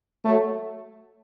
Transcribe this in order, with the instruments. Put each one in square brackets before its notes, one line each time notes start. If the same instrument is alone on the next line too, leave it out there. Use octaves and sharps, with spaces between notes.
[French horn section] F#3 A3